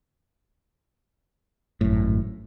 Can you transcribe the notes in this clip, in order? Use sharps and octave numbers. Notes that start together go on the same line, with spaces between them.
G#1 F#2 A2